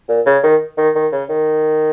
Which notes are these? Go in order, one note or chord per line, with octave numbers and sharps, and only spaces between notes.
A#2
C#3
D#3
D#3
D#3
C#3
D#3